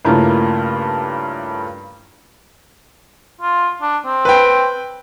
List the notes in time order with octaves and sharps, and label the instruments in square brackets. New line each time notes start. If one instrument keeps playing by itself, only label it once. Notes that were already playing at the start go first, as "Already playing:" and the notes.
[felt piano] G2 C#3 A3 A#3 E4 F4
[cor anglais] F4
D4
C4
[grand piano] B4 G5